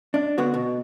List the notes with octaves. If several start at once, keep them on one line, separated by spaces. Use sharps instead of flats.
D4
D3 B3 F#4
B2